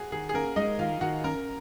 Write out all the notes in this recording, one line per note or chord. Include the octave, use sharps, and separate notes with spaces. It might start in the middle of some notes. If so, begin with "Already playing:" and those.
Already playing: F#4 G#4
D#3 G#4
G#4
A#3 C#4 A#4
G#3 D#4 D#5
D#3 F4 F5
D#3 F#4 F#5
C#4 A#4 A#5